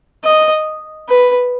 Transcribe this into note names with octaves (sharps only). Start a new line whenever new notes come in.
D#5
B4